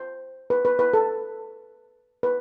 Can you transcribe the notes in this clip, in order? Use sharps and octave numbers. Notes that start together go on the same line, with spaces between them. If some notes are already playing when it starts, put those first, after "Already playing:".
Already playing: C5
B4
B4
B4
A4
B4